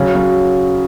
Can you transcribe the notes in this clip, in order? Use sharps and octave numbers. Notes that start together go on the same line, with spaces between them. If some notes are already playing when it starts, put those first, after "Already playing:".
Already playing: C#3 F#3
F#3